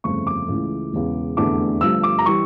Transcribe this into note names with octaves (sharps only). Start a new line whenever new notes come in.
G1 F2 C#3 F3 A3 C#6
D6
C#2 C#3 E3 A3
E1 E2 C#3
F1 E2 D3 A3 D6
G1 G2 F3 A3 E6
D6
A#5
E3 G3 C#6